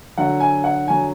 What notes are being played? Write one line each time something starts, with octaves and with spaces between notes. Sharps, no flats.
D3 F#3 F#5
G#5
F#5
D3 F#3 G#5